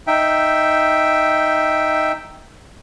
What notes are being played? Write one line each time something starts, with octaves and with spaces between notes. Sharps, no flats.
D#4 E5 G5